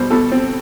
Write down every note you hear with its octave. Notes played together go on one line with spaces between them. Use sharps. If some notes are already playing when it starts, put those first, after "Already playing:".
Already playing: B2 G3 C5
B2 A4
C4